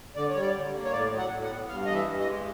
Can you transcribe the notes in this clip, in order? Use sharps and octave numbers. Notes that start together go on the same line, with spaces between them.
D3 D5
G3 C#5
D5
D3
A#3
C#5
A2 D5
F#3
F#5
A2
F#5
B3
G2 F5
E3 D#5
E5
G2
D#5
G#3